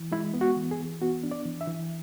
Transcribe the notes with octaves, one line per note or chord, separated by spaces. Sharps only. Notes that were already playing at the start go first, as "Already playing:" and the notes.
Already playing: E3
G#3 E4
B3
F#4
E3
G#4
E3
B3 F#4
D4
D5
E3
E5
E3